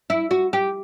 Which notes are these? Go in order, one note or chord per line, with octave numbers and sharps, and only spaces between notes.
E4
F#4
G4